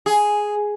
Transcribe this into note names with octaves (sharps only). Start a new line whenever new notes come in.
G#4